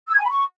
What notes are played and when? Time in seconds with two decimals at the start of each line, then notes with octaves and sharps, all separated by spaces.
0.08 E6
0.13 G#6
0.19 G#5
0.24 B5
0.30 C#6